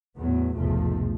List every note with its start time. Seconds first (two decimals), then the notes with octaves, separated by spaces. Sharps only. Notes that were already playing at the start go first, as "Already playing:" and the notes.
0.17 E2 A2 F#3 B3
0.56 F1 B1 E2 G#2 F3 A3